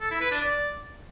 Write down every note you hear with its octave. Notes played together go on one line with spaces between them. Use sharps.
A4
E4
B4
D4
D5